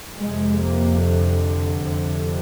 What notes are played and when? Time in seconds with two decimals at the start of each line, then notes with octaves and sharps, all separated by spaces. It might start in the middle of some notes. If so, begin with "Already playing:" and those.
0.19 F2 C3 G#3
0.59 A#3
1.00 D3
1.80 F2 C3